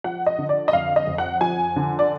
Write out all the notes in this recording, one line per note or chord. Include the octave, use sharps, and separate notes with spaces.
F3 F#5
D#5
D3
D5
D#5
F2 F5
D#5
F2
F#5
F3 G#5
D3
D5